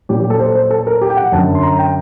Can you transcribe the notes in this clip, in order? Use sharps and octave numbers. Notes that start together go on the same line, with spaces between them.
A#2 F#3 G4
G4
A4
C5
C5
A4
A#4
G4
G5
F#5
F#2 D3 F#3 A5
C6
A#5
G5